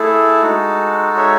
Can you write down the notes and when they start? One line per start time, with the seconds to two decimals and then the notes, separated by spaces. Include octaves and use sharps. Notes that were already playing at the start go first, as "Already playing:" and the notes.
Already playing: A3 E4 G#4 A4
0.42 G#3 D#4 F#4
1.17 C#5 E5